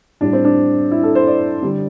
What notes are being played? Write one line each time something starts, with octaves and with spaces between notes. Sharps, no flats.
A2 G3 D4
C4
D4
E4
A4
C5
D5
D3 G3